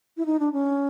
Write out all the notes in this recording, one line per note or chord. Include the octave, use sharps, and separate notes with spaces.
E4
D#4
D4
C#4